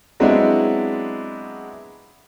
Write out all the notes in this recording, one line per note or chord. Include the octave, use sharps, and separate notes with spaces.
F#3 G#3 B3 C4 D4 E4